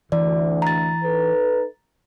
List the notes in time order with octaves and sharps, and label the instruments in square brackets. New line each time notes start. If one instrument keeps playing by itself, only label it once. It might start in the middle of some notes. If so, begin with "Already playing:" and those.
[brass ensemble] D2 [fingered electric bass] E3 [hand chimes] D5
[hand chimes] A#5 A6
[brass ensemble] D#4 A4 B4